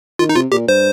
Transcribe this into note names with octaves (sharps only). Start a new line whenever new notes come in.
D#3 F4
D#4
C3 F4
A#2 G4
G2 C5